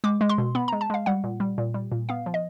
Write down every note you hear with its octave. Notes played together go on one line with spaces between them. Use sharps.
G#3 D6
G#3
C6
B2
B3 B5
G#3 A#5
A5
G#3 F5
G3 F#5
A#2
G3
A#2
G3
A#2
B3 F5
F3
D#5